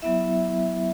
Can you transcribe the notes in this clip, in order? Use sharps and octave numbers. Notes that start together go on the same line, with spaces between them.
F#3 B3 E4 E5